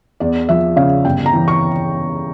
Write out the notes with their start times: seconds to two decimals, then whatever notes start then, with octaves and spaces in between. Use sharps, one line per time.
0.20 E2 D5
0.49 F3 E5
0.76 C#3 F5
1.05 G1 G5
1.26 A#5
1.33 E3
1.48 C#6